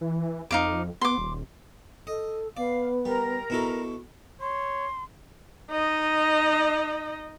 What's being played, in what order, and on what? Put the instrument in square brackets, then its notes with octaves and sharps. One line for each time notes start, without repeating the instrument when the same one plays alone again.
[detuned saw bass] E3
[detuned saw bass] F2 [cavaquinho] D#4 F5 D6
[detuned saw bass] B3 [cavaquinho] C6 D6
[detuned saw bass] D#1
[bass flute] A4 [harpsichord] D#5
[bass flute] B3 [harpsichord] D5 [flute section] F5
[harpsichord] G3 [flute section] A#4 A#5
[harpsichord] B2 E4 A4 [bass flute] F#4
[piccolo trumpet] C#5 [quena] C6
[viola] D#4 D#5